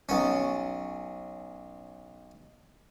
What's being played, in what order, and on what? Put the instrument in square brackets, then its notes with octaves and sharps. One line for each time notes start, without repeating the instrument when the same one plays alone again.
[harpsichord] B1 C#4